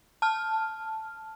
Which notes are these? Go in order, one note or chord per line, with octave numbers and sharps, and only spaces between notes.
A5 F6